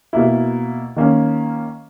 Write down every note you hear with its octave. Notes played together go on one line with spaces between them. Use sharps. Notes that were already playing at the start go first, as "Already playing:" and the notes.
B2 A#3 E4
D#3 A#3 C#4